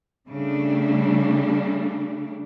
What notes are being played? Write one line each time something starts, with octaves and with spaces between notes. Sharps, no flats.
C#3 G3 A3 D4